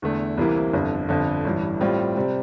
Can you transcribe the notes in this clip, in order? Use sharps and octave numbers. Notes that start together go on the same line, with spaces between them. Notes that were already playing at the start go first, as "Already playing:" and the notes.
E2 D3 A3
C2 C3 E3 A#3 E4
G1 F2 D3
G1 F2 D3
A1 G2 E3
A2 G3 C4 F4
C3 G3 C4